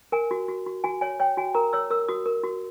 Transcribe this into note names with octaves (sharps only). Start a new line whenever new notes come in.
A#4 G#5
F#4
F#4
F#4
F#4 G#5
C#5 G#5
C#5 G5
F#4 G#5
A#4 A#5
C#5 E6
A#4 E6
F#4 D#6
A#4
F#4